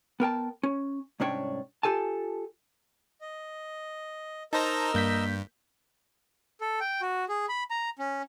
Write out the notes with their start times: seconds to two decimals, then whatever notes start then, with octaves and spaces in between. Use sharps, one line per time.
0.20 B3 A#4 G5 A5
0.63 C#4
1.20 C2 G#2 C#4 D4 C#5 G5
1.83 F4 G4 A4 G#5 A5
3.21 D#5
4.53 D#4 A#4 C5 D#5 A5 A#5 E6 A#6
4.94 G2 A#3 G6 B6
6.61 A4
6.80 G5
7.02 F#4
7.29 G#4
7.49 B5
7.71 A#5
7.99 C#4